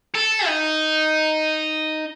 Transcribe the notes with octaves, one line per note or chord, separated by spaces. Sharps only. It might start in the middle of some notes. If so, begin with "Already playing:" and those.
A4
D#4